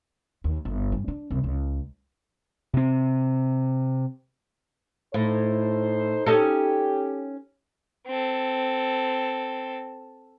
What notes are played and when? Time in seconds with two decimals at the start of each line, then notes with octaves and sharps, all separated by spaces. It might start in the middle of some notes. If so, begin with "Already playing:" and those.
0.44 D#2
0.65 G1
0.92 G2
1.08 D4
1.31 C2
1.44 C#2
2.73 C3 C4
5.14 A2 D#4 A4 C5
6.26 C#4 D#4 G4 A4
8.07 C4 A4